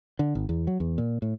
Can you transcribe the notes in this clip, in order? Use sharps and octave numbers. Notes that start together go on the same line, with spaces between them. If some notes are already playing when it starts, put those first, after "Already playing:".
D3
G#1
E2
F#3
E2
A#2
A2